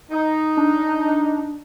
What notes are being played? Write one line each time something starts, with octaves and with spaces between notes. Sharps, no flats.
D#4
D4